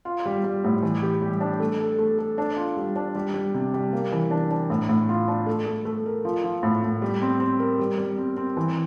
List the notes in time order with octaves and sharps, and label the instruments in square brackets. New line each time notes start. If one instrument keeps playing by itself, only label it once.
[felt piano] F4
G3
G3
A2
E3
G4
G3
D4
A3
A4
A3
A4
D4
F4
G3
D4
G3
G3
C3
G3
A#3
E3
D4
D4
A2
A2
F4
D4
A3
A3
A3
A#4
F3
F3
A2
A2
G3
C4
C4
A#4
G3
G3
C4
C4
E3